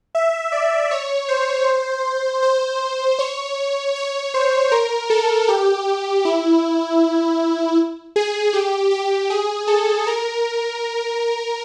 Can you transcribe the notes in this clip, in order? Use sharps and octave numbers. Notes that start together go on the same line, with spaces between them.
E5
D5
C#5
C5
C5
C#5
C#5
C5
A#4
A4
G4
E4
G#4
G4
G4
G#4
A4
A#4